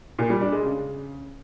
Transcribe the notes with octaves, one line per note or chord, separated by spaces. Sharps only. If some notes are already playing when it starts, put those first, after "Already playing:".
A#2
G3
D4
G#3
C#3